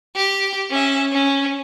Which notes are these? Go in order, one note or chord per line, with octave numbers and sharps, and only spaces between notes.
G4
C#4 E5
C#4